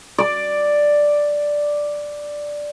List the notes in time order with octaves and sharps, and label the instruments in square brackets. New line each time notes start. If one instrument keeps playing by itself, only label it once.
[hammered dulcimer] D5 D6